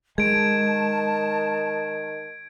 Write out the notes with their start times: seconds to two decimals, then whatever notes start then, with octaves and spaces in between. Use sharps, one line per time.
0.18 D#3 G#3 A5 G#6 D7